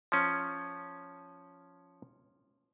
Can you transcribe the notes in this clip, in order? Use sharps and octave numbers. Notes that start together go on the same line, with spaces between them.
F3 C#4